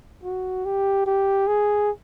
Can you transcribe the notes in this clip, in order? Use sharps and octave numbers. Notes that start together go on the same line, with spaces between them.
F#4
G4
G4
G#4